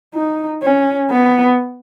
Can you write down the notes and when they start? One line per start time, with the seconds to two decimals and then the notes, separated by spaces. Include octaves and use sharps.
0.14 D#4
0.62 C#4
1.10 B3